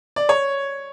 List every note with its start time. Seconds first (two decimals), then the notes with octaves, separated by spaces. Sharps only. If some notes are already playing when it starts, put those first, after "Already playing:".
0.16 D5
0.29 C#5